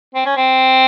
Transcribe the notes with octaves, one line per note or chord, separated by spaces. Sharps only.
C4
C#4
C4